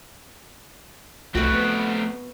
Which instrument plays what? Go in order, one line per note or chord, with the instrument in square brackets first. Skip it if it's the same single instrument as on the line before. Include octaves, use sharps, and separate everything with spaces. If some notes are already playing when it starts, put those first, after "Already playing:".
[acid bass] C2 [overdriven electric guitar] A3 C4 [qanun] F#4 B4
[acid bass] B3